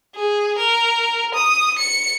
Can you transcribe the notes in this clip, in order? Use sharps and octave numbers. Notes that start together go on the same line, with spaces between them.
G#4
A#4
D#6
C#7